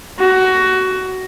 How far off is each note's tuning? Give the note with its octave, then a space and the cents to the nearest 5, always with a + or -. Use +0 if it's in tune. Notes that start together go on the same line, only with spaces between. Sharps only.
F#4 +15